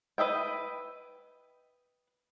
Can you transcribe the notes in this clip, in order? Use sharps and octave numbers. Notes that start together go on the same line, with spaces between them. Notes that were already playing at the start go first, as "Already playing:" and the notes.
B4 D#5 E5 G5